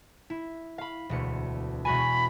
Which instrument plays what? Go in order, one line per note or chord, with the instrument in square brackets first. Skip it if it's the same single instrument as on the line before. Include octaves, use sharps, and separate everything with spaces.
[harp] E4
F5 B5
E1 D2 C#7
[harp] E1 F#4 G#5 [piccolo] B5